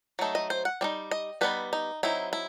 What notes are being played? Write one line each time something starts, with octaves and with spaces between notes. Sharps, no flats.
F#3 A3 D#4
D#5
C5
F#5
G3 C4 D#4
D#5
G3 B3 D#4 B4
D#4
F#3 C4 D#4 E4
E4